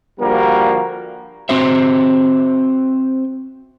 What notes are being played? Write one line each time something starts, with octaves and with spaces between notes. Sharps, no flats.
D3 F3 G3 A#3 F#4 A#4
C4 F#4 C5 E5